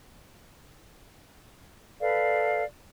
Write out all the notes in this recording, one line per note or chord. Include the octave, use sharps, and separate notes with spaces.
A4 B4 D5 F5